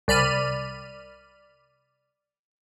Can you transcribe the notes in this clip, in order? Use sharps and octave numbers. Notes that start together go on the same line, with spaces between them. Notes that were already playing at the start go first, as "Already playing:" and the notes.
C2 D5 B5 F6 D#7